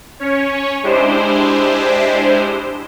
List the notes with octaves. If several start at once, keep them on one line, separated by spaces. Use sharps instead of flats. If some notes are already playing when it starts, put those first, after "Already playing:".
C#4 C#5
G#3 D4 E4 G4 C5